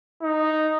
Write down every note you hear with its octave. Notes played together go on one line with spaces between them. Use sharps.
D#4